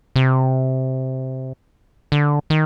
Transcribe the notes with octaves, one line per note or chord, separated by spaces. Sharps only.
C3
D3
D#3